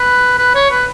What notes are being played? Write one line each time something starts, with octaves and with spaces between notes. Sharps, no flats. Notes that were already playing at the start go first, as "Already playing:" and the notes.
Already playing: B4
B4
C#5
B4